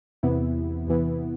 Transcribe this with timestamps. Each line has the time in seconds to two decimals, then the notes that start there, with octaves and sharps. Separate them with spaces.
0.23 E2 C3 E3 B3 E4
0.87 E2 C3 E3 B3 E4